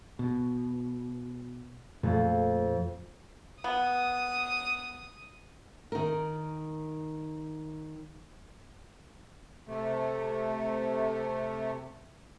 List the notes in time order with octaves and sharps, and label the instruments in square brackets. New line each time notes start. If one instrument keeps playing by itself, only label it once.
[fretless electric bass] B2
[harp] F2 [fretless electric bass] A#2 A3
[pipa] B3 [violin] D#6
[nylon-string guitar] D#3 A#4
[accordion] C3 A3